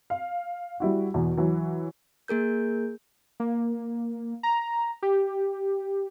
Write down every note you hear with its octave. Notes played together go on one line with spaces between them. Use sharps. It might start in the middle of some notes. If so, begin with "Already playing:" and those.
F5
G3 E4 F#4
E2 B2
E3 F#3
A#3 G#4 A#4 G6
A#3
A#5
G4